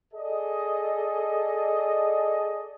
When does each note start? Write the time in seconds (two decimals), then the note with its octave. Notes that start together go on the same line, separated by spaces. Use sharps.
0.14 G#4 A4 D5 D#5